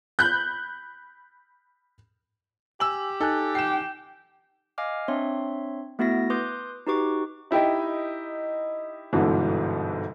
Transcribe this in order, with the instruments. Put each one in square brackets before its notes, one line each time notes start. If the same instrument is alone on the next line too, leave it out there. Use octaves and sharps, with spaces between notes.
[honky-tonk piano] B5 F#6 G6
[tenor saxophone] G4 [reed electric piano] G#5 [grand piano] E6 F#7
[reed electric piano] D#4 G#5 F#6 [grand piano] A4
[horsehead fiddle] G5 [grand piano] C7 E7
[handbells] D#5 F5 G#5 D6 F6
C4 D4 C#5 E5 C6
A3 B3 E4 F#4 E5 A#6
B4 C6 D6 D#6 G6
D#4 F#4 G4 B4 C#6 D6
[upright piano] D#4 E4 G4 D#5 G5
G1 G#2 B2 D3 E3